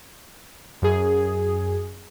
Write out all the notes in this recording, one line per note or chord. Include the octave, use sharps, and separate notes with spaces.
F#2 G#4